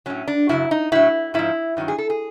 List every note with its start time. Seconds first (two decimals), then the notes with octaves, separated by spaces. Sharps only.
0.06 A2 F#3 C#4
0.28 D4
0.49 F#2 C#3 F#3 E4
0.71 D#4
0.92 A2 F#3 E4
1.34 G#2 F3 E4
1.77 G2 D#3 F#3
1.88 G#4
1.98 A4
2.10 G#4